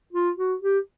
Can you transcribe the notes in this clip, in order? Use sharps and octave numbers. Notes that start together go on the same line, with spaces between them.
F4
F#4
G4